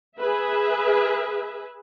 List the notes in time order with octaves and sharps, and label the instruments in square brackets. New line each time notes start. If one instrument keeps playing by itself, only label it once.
[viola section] G#4 B4 E5